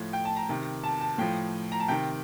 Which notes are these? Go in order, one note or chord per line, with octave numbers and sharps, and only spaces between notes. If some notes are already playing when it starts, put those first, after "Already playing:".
Already playing: A2 F3
G5
A5
A#5
C3 D#3
A5
A5
A2 F3 G5
A#5
A5
C3 D#3 G5